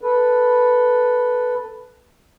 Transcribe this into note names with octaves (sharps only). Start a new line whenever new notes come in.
A4 B4